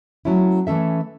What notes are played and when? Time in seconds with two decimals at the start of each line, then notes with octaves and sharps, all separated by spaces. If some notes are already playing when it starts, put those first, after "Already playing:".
0.25 F#3 A3 C#4 E4
0.67 E3 A3 C#4 A4 E5